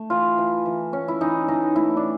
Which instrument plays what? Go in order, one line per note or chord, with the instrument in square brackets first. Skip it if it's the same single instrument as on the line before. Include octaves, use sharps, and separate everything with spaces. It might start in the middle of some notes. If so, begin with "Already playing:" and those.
Already playing: [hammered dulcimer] A3
E3 F4
E3
E3
C#4
E4
E3 D#4
E3 D#4
A3 E4
D4